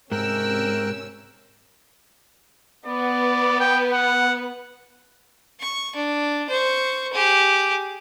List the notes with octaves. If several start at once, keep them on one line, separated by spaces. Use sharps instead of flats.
G#2 C3 C#4 A#4 G5 E6 F#6
B3 D5
G5
F#5
C#6
D4
C5 C#6
G4 G#4